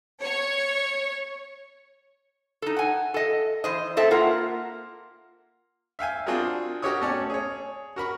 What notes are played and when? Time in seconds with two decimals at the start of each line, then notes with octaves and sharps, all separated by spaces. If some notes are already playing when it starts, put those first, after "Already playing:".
0.20 C#5
2.62 D#4 A4
2.76 F#5 G#5
3.14 A4 D#5
3.64 E3 C5 D#5
3.97 C4 A4 E5
4.11 A#3 F4 A#4 F#5
5.99 E5 F5 G5 G#5
6.26 C4 D4 F4 F#4 G#4 A#4
6.82 F#4 G4 A#4 C#5 C#6 D#6
7.02 A3 C#4 D5
7.30 G#4 C#5
7.96 F#4 A#4 B5 C#6